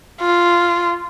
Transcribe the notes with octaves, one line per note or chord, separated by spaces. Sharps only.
F4